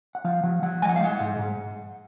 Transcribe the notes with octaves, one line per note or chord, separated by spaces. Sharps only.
F#5
F3 F5
F3 F#5
F3 F#5
G#3 G#5
F#5
F5
G#3 F#5
G#2
G#2